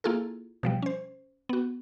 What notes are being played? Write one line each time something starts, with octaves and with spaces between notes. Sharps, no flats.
A#3 E4 F4 G#4 A4
B2 F3 G3
C#4 C5
B3 F#4